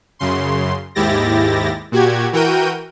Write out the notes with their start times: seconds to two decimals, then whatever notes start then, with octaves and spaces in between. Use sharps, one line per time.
0.19 F#2 C#3 C6
0.95 D#2 G#2 E4 G4 A6 A#6
1.92 A#2 F#4 G4 G#6
2.33 E3 F#4 A#4 G5 G6 D#7